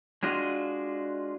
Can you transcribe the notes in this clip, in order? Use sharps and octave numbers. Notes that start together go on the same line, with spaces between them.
G#3 D4 F4 F#4 D#5